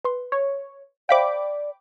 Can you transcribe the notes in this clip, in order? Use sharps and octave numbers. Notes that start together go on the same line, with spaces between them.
B4 C6
C#5
C5 D5 E5 F5 G5 B5 D6